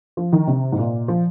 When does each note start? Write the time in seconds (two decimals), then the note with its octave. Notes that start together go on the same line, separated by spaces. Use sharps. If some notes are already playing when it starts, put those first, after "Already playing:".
0.17 F3
0.33 D#3
0.47 C3
0.72 G#2
0.78 A#2
1.08 F3